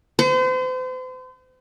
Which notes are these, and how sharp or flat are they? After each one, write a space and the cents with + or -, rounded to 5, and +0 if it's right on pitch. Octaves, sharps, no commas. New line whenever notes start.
C5 -40